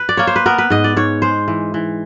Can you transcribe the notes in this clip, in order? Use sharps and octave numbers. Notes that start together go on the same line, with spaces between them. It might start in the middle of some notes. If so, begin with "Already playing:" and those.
Already playing: B4
D5
A#3 C#5
C5
B4
B3 A#4
B4
G#2 D#5
D5
G#2 C#5
G#3 C5
E3
E3